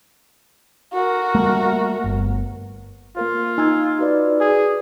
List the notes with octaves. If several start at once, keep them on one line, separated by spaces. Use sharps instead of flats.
F#4 A#4
G3 A3 A#3
G1
A#3 F4 A#4 C5
D#4 G#5 E6 G#6
F#4 B4 D5
G#4